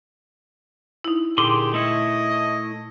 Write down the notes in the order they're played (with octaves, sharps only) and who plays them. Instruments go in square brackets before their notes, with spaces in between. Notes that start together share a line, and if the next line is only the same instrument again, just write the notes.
[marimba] D#4 E4
[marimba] A#2 [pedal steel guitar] D3 G#4 C6 [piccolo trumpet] G4
[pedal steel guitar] A3 E4 C#5 [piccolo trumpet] D#5